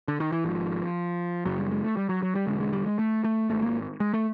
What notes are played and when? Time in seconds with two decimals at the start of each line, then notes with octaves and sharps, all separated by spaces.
0.08 D3
0.20 D#3
0.32 E3
0.44 G#1 G#2 F3
1.45 F#1 F#2 C#3 F#3
1.59 G3
1.72 G#3
1.84 A3
1.97 G3
2.09 F#3
2.22 F#3
2.35 G3
2.47 E1 D#2 D3 G#3
2.60 G#3
2.73 G3
2.86 G#3
2.99 A3
3.24 A3
3.49 G#1 G#2 A3
3.62 A#3
4.00 G#3
4.14 A3